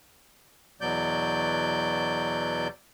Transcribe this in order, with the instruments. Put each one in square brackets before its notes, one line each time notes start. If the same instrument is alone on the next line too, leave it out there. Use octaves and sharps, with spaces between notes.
[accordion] E2 B2 F#3 D5 G6